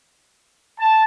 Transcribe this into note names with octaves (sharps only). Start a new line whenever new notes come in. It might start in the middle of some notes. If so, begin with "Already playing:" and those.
A5